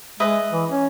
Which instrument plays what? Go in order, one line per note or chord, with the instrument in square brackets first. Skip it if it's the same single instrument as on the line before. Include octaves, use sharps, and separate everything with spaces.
[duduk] G#3 [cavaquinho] B4 D#5 E5
[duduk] E3
C#4